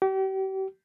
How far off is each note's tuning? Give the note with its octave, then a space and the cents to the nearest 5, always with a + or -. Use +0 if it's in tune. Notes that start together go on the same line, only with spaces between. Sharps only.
G4 -40